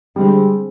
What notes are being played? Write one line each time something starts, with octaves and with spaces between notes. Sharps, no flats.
D3 G3 G#3 C4